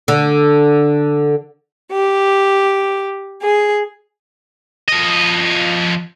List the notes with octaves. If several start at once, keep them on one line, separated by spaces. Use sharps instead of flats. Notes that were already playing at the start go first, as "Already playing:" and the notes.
D3
G4
G#4
F3 D#5